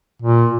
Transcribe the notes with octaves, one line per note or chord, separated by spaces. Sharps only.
A#2